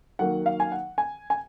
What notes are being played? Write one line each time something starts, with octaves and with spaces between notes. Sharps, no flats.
D#3 F#3 A#3 F#5
F5
G#5
F#5
G#5
G#5